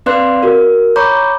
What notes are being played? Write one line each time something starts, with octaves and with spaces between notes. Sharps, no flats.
C4 B4 D5 F5 C6 F#6
F#4 A#4
C#5 A#5 B5 C#6 D6 G6